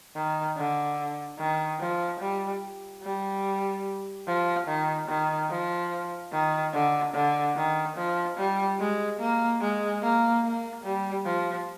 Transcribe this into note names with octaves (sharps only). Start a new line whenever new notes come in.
D#3
D3
D#3
F3
G3
G3
F3
D#3
D#3
F3
D#3
D3
D3
D#3
F3
G3
G#3
A#3
G#3
A#3
A#3
G3
F3